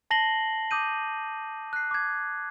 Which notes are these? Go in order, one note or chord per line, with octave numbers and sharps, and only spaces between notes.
A5 A#6 C7 F#7 G7
D6 D#6 G6 D#7
F#6 C7
D6 G#6